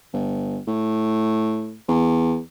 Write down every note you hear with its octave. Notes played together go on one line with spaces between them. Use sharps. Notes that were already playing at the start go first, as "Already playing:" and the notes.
G1
A2
E2